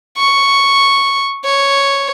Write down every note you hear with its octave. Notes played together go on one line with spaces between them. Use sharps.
C#6
C#5